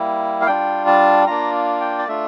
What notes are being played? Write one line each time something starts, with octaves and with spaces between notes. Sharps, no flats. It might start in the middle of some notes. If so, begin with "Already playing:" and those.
Already playing: G3 A#3 E4
F5
G3 D4 F4 G5
A5
A#3 D4 F4 A#5
G5
D5
A3 D4 F4 E5